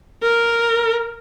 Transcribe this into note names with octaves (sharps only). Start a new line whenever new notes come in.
A#4